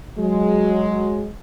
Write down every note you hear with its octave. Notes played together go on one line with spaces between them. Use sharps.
F#3 G#3